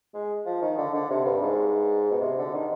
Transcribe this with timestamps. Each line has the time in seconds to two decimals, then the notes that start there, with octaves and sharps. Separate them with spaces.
0.14 G#3
0.46 F3
0.62 D#3
0.78 D3
0.93 D3
1.10 C3
1.25 G2
1.42 G#2
2.11 B2
2.21 C3
2.38 D3
2.54 D#3